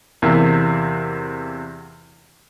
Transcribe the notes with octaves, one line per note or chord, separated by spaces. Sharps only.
E2 C3 A#3 E5